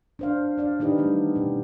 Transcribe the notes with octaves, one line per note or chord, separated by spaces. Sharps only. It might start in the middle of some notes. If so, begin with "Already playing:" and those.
D4 C5 F5
D4 D5 F5
D#3 D4 D#4 G4 B4 D#5
E3 G3 A3 B3 D4
B2 C#4 G4